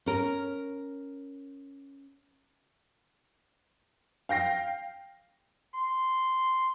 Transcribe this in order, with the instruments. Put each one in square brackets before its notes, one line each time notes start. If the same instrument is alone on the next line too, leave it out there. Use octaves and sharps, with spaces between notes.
[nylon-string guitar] C#4 A#4
[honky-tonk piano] F5 G5 A#6 C7
[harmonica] C6